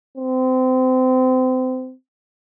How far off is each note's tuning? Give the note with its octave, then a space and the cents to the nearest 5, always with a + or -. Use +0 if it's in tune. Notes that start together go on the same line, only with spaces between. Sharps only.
C4 -30